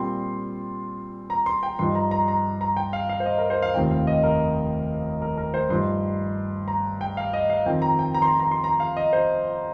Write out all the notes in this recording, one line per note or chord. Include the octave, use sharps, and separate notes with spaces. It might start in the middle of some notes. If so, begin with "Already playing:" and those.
Already playing: A#2 G3 C4 F4 C6
A#5
C6
G5
G2 F3 D#4 C6
A#5
A#5
A#5
A#5
G5
F5
F5
C5
D#5
A#4
C5
F5
F1 D#2 D#3 C4 F4 G5
F5
D#5
A#4
A#4
A#4
C5
G2 F3 D#4 C6
A#5
G5
F5
D#5
F5
F2 D#3 C4 G5
A#5
G5
A#5
C6
A#5
A#5
C6
A#5
F5
D#5
C5